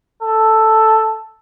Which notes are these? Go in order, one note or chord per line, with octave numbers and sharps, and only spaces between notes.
A4